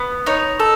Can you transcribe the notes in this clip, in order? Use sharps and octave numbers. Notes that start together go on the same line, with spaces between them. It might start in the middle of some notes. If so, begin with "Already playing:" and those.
Already playing: B3
D#4 C#5
A4